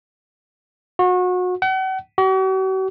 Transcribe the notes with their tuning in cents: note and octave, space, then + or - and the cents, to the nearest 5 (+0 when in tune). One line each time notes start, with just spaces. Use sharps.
F#4 -30
F#5 +40
F#4 +45